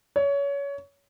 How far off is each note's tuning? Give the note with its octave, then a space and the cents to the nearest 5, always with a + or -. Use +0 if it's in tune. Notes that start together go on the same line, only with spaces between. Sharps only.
C#5 +25